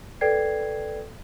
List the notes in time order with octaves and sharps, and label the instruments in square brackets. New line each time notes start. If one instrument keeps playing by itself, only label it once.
[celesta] A4 B4 D5 G5 G#6 C7